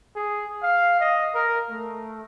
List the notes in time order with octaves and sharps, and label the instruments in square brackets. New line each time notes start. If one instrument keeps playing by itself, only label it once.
[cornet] G#4
F5
D#5
A#4
A3